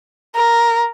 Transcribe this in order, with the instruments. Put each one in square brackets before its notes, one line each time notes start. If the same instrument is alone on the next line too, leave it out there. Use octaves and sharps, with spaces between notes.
[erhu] A#4